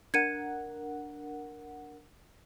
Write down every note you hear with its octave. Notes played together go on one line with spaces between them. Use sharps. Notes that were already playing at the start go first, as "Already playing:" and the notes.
D4 A#4 F#5 G#6 C#7 D#7